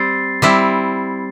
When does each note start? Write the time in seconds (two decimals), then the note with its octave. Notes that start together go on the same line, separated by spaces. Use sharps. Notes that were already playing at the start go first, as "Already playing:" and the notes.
Already playing: G3 C4 A6 C7
0.42 G3 C4 E4